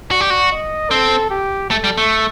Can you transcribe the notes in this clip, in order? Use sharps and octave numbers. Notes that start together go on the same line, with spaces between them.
F#4 D5
G4
F#4
D#5
C4 A4
G4
A3 A4
G3
A3